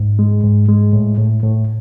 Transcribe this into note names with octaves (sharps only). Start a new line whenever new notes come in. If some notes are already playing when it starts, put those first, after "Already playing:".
Already playing: G#2
G#3
G#2
G#3
A2
A2
A2